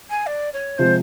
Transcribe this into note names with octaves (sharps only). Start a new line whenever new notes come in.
G#5
D5
C#5
C3 F3 G#3 C5